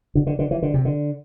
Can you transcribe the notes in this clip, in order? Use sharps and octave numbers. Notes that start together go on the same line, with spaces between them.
D3
D3
D3
E3
D3
C3
D3